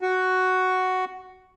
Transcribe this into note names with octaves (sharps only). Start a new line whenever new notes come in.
F#4